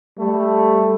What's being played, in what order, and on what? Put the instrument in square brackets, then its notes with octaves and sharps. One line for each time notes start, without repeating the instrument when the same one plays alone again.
[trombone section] G3 A3